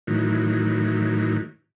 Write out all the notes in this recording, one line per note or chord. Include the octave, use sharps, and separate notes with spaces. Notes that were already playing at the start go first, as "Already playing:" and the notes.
A2 D#3 E3 F#3